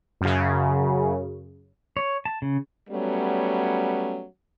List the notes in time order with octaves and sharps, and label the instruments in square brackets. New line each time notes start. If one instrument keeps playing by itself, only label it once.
[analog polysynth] F#2 C#3
[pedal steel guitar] C#5
A5
C#3
[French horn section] F#3 G3 A3 B3 C#4